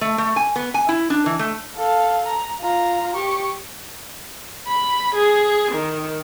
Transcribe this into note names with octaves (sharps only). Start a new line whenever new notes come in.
A3
A3
G#5
B3
G#5
E4
D4
E3
A3
A4 F5
A#5
F4 A#5
G4 C#6
B5
G#4
D#3